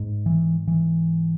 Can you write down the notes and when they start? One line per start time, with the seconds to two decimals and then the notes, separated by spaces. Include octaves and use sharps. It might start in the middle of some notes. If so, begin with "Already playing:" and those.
Already playing: G#2
0.26 E3
0.68 E3